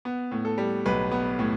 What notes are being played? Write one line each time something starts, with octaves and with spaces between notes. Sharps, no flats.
B3
A2
A4
G3
B1 B4
B3
A2